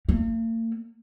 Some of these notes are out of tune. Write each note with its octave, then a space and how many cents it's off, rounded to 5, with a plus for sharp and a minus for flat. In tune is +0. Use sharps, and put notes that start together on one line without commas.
A#3 -45